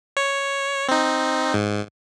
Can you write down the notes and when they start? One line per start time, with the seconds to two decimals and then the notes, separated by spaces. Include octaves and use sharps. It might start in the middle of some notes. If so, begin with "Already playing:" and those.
0.17 C#5
0.88 C4 D#4
1.54 G#2